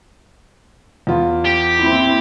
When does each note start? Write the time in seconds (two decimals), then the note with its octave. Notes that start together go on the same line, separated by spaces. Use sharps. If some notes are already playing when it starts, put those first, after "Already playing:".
1.07 E2 F4
1.46 G4
1.79 A#3 C4 E4